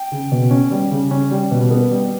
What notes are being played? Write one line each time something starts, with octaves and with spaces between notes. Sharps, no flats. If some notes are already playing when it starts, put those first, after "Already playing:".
Already playing: G5
C#3
B2
C#4
G3
C#3
C#4
G3
B2
B3
G3